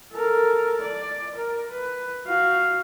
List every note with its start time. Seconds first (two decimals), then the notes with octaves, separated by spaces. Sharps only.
0.12 A4 A#4
0.81 D5
1.36 A#4
1.71 B4
2.27 F#4 F5